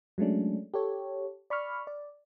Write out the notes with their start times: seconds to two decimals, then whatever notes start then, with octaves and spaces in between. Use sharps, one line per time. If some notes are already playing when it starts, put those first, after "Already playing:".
0.18 F#3 G#3 A3 C#4 D4
0.74 G4 A4 C#5
1.50 D5 B5 C#6 F6
1.87 D5